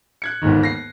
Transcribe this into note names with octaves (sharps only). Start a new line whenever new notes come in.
F#6 G#6 C#7
G1 D#2 G#2 D#3
A#6 C7